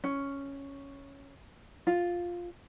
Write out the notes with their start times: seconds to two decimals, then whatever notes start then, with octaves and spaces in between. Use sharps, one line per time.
0.04 C#4
1.87 F4